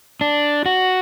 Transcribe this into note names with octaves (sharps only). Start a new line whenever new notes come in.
D4
F#4